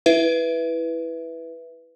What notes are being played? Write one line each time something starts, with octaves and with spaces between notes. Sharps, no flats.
E4 B4 E5